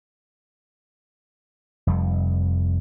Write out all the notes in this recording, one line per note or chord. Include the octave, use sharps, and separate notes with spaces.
F1 F2 G3